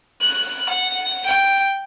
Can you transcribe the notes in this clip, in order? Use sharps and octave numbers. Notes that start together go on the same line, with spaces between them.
F#6
F#5
G5